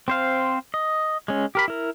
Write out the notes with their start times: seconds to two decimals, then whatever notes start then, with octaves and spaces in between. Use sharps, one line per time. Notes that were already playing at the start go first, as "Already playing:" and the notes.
0.08 C4 C5 F5
0.74 D#5
1.28 G#3 C#4
1.55 G4 A#4 B5
1.68 E4 A#4